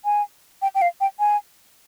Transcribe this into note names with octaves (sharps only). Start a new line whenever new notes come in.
G#5
G5
G5
F5
G5
G#5